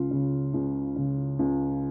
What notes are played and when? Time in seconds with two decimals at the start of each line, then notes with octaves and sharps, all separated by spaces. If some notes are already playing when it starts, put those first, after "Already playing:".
Already playing: C#2 F4
0.11 C#3
0.54 C#2
0.96 C#3
1.39 C#2